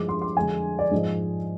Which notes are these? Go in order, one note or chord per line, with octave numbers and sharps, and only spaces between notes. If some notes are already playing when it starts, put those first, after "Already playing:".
Already playing: G2 F3 G#3 D6
C6
C6
F2 D3 G#3 G#5
D5
G#2 F3 G#3 D#5